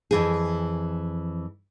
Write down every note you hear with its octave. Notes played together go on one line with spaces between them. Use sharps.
F2 E3 G#4